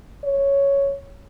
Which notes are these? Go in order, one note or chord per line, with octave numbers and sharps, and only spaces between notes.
C#5